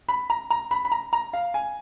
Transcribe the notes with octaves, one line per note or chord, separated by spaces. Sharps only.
B5
A#5
A#5
B5
B5
A#5
A#5
F5
G#5